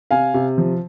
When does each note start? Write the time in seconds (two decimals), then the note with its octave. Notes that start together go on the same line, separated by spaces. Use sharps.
0.11 C3 F5 G#5
0.34 C3
0.58 F3